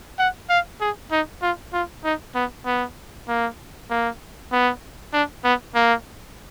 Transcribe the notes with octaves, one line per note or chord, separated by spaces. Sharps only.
F#5
F5
G#4
D#4
F4
F4
D#4
B3
B3
A#3
A#3
B3
D4
B3
A#3